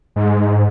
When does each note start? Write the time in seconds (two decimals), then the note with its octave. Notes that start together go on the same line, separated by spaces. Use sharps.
0.16 G#2